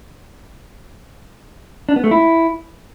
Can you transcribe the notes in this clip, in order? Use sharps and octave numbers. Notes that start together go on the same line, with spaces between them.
D4
B3
A3
E4